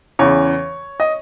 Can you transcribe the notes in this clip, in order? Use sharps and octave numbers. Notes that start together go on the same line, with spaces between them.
E2 C#3 E3 C#5
D#5